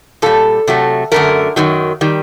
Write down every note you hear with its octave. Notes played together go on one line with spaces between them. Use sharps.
A#2 G3 A4
C3 F#3 A3
F#2 D3 A3 A#4
F#2 D#3 F#3
D#3 G3